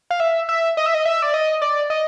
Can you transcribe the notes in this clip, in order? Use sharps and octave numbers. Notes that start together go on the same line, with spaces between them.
F5
E5
E5
D#5
E5
D#5
E5
D5
D#5
D5
D#5